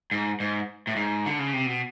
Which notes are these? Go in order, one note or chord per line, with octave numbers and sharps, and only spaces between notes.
G#2
G#2
A2
G#2
D3
C#3
C3
B2